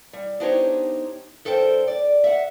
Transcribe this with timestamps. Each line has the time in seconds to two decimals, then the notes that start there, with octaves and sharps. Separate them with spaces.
0.13 G3
0.40 B3 D4 D#4 G4 C5 C#5
1.45 G2 A4 A#4 C5 G5
1.88 D5
2.24 E5 F#5